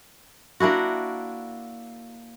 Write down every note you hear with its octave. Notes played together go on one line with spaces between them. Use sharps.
A#3 D4 E4 F#4